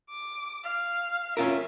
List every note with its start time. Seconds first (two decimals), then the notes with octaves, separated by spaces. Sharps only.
0.10 D6
0.64 F5
1.37 C#4 F4 A#4 E5